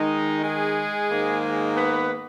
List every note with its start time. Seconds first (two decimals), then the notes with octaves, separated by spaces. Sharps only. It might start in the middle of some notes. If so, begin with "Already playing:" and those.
Already playing: D#3 G#3 D#4
0.43 G#3 G#4
1.10 G#2 D#3 A#3 D#4
1.76 B3 B4